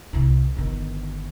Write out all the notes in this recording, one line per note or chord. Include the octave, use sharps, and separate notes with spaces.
C2 E4
G1 D#3